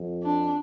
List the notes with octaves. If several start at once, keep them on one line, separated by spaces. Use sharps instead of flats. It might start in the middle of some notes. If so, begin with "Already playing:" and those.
Already playing: F2
D4